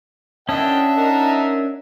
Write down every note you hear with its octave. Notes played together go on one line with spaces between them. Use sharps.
C#4 D4 D#5 E5 F#5 G5 A5
D#4 A#4